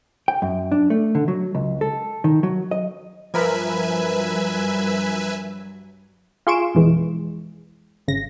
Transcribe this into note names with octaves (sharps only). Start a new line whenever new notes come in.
G5
F#2
D4
A3
D3
F#3
C#2
A4
D#3
F#3
D#5
G2 F3 F#3 A#4 B4 E5 G#5 B5
F4 G#4 C6 C#6 D7 E7
F2 B2 E3 G#3
G1 C#3 A#6